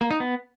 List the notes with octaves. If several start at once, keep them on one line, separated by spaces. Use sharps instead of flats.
A#3
D#4
B3